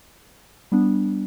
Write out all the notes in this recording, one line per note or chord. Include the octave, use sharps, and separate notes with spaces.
G3 B3 D4